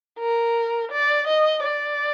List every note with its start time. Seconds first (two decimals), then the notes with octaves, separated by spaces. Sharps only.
0.19 A#4
0.91 D5
1.27 D#5
1.64 D5